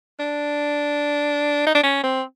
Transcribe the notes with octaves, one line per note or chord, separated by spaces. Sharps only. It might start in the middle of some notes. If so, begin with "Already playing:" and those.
D4
D#4
D4
C#4
C4